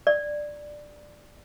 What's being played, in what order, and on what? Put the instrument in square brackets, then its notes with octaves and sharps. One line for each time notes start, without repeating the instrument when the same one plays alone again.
[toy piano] D5